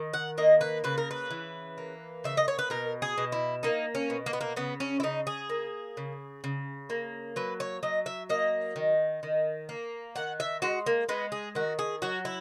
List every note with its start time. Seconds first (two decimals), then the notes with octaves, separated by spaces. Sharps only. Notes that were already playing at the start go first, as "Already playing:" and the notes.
Already playing: D#3
0.13 F#5
0.38 A#3 D#5
0.61 B4
0.84 C#3 B4
0.98 A#4
1.11 B4
1.31 E3
1.78 A#3
2.24 C#3 E5
2.37 D#5
2.48 C#5
2.59 B4
2.70 B2 A#4
3.02 G#4
3.18 B2
3.32 E4
3.63 A#3 D#4
3.95 C#4
4.10 B2
4.26 A#3
4.33 B3
4.41 A#3
4.56 C#3 B3
4.80 C#4
5.00 E4
5.03 C#3 D#4
5.27 G#4
5.49 A#3
5.97 C#3
6.44 C#3
6.90 A#3
7.36 F#3 B4
7.60 C#5
7.83 F#3 D#5
8.06 E5
8.29 A#3 D#5
8.76 D#3
9.23 D#3
9.69 A#3
10.15 D#3 F#5
10.40 E5
10.62 G#3 F#4
10.86 A#3
11.09 G#3 B3
11.32 G#4
11.55 D#3 F#4
11.79 G#4
12.02 F#3 F#4
12.25 E4